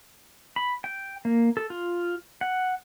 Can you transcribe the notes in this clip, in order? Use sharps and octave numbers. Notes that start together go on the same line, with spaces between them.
B5
G5
A#3
A4
F4
F#5